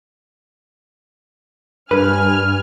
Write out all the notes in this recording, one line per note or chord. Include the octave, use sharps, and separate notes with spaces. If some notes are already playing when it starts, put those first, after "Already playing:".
G2 B4 G#5 F6